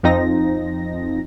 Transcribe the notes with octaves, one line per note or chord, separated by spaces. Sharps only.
F2 F3 C4 D#4 A#6